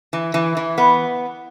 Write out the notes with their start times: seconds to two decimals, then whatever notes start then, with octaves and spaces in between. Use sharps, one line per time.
0.13 E3
0.34 E3
0.57 E3
0.78 B3